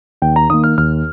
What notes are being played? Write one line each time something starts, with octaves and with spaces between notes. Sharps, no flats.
D#2 G5
A#5
D#3 A#3 D#6
F6
D#2 F6